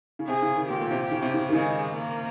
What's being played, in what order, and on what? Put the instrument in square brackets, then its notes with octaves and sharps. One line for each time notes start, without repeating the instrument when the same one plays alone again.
[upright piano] C#3
[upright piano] C3 [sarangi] G#4
[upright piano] C#3
D#3
[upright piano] A#2 [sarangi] G4
[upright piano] A#2
C3
C#3
C3
C#3
D#3
[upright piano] C#3 [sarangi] G#3
[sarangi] A#3